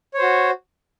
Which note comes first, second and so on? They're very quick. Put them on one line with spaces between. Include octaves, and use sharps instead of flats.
C#5 C5 F#4